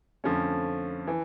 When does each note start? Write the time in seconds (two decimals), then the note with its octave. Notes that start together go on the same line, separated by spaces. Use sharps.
0.24 F2 D3 F3 A3 C#4
1.07 E3